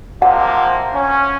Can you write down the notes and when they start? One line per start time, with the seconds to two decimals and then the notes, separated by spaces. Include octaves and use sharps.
0.22 C3 F3 A#3 F#5
0.93 C#4